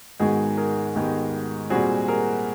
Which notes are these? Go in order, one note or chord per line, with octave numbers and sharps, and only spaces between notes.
G#2 D#3 G#3 B3 F#4 G#4
G#4 A#4
G#2 D#3 G#3 B3 G4
A#2 G3 C4 F#4 G#4
G#4 A#4